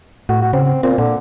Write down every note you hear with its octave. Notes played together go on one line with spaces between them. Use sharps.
A2 F#4
F#4
C#3 C4
A#2 C4
A#2 D3